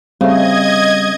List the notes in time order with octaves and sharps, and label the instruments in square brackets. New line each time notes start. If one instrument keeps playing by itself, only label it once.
[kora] C#3 A3 [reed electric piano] G3 [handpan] C4 [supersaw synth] D#5 G#6